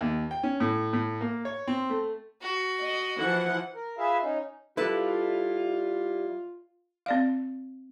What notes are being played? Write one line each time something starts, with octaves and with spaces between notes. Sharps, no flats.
D#2
G5
C#4
A2
A2
A#3
C#5
C4
A3
F#4
D#5
E3 F3 F#5
A#4
F4 G#4 B4 E5 F5
C#4 D#4
G3 E4 F4 A4 B4
C4 D5 F5